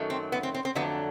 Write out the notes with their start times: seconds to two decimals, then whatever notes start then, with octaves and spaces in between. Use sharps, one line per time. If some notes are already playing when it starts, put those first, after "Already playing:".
Already playing: F#2 D#3 F#3 A3
0.10 C4
0.32 B3
0.43 C4
0.54 C4
0.65 C4
0.75 F2 D3 F#3 A3 B3